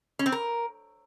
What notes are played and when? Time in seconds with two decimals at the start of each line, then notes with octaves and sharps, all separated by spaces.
0.19 C#4
0.26 C4
0.32 A#4